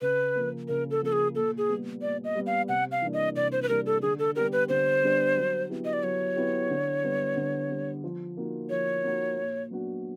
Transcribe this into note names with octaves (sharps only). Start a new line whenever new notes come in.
C#3 B4
F3 A#3
C#3 A#4
A4
F3 A#3 A4
G#4
A#2 A4
G#4
G3 B3
A#2 D5
D#5
G3 B3
F5
C3 F#5
F5
E3 G3 A#3 D4
D#5
C3 D5
C5
B4
E3 G3 A#3 D4 A#4
A4
D3 G#4
A4
G3 B3 D4 G4 A#4
B4
D3 C5
G3 B3 D4 G4
F#3
B3 E4 G4
D#5
D5
F#3 C#5
B3 E4 G4
D3
G3 B3
D3
G3 B3
F3
A#3 D#4 F#4
F3 C#5
A#3 D#4 F#4
A#2
F#3 B3 D4 F#4